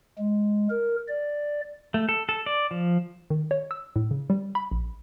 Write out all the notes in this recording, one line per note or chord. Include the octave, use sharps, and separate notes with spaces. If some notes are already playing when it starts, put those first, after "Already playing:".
G#3
A#4
D5
A3
A4
A4
D5
F3
D#3
C#5
E6
A2
C#3
G3
B5
A#1